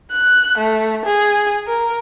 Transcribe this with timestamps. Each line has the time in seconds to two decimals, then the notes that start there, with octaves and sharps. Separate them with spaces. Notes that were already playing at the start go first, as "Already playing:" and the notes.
0.12 F#6
0.58 A3
1.05 G#4
1.67 A#4